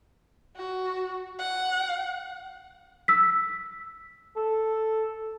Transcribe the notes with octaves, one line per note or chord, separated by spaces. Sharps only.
F#4
F#5
E6 B6
A4